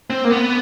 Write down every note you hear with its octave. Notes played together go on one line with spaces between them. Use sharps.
C4
A#3
B3